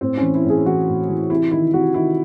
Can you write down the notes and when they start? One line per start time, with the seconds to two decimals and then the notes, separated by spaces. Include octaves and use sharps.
0.01 A2 C4
0.17 C#4
0.22 E3
0.34 E4
0.44 A2
0.50 G#4
0.66 E3 F#4
0.88 A2
1.09 E3
1.30 C3 E4
1.51 D#3 E4
1.73 C3 F#4
1.94 D#3 E4